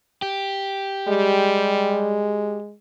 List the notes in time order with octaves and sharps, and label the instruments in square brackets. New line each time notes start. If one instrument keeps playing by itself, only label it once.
[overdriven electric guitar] G4
[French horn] G3 [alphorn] G#3